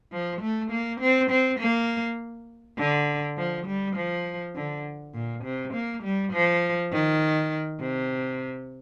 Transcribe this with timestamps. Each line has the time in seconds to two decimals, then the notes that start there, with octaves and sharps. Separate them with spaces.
0.12 F3
0.41 A3
0.71 A#3
1.01 C4
1.30 C4
1.60 A#3
2.78 D3
3.37 F3
3.67 G3
3.96 F3
4.55 D3
5.14 A#2
5.44 C3
5.74 A#3
6.04 G3
6.33 F3
6.92 D#3
7.81 C3